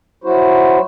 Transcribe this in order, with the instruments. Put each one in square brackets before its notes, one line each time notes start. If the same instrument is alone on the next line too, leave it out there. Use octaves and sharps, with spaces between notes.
[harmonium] F#3 E4 F#4 C5